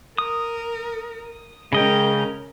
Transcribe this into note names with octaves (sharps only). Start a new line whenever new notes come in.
A#4 D#6
C#3 G#3 C#4 A#4 D#5 G5